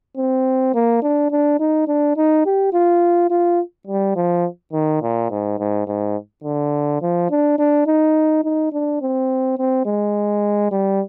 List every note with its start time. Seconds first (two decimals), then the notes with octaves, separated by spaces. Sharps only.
0.17 C4
0.74 A#3
1.03 D4
1.31 D4
1.60 D#4
1.87 D4
2.17 D#4
2.46 G4
2.73 F4
3.30 F4
3.87 G3
4.16 F3
4.73 D#3
5.02 A#2
5.30 G#2
5.58 G#2
5.87 G#2
6.44 D3
7.02 F3
7.30 D4
7.59 D4
7.87 D#4
8.44 D#4
8.72 D4
9.01 C4
9.58 C4
9.86 G#3
10.71 G3